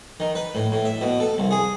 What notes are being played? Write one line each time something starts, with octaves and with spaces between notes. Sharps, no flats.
D#3
B4
A2
A2
E5
B2
A4
C2
G#4